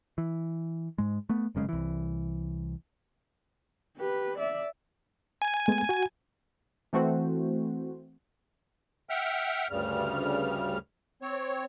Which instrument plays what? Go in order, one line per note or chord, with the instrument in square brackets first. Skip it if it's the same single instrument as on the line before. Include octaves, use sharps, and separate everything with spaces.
[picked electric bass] E3
G#2 G#3
A3 B3
F1 F#2 C#3 G#3
C2 E3
[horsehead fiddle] G4 B4
D5 E5
[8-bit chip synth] G#5
[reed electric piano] G#3 A3 B3
F#4
[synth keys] E3 A3 C4 F#4 C5
[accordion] E5 F#5 G5 F6
D2 G2 C#3 G3 F6
C4 C#5